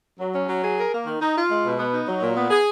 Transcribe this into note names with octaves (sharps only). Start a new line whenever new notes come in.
F#3
C#4
F#3
G#4
A#4
A#3
D#3
D#4
F4
G#3
B2
B3
D#4
F#3
A#2
B3
G#4